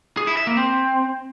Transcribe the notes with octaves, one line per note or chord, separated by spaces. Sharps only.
G#4
E4
E5
A#3
C4